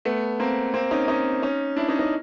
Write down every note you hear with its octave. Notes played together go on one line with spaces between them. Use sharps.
A3 B3
A#3 C4
A#3 C4
C#4 D#4
C#4 D#4
C#4 D#4
D4 E4
C#4 D#4
C#4 D#4